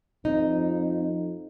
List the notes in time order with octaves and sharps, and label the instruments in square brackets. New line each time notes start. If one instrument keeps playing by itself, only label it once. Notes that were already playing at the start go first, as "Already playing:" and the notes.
[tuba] F2 [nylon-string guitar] D#4